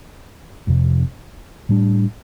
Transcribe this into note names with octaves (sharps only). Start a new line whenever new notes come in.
F1 F2 C3
A2 G3 D4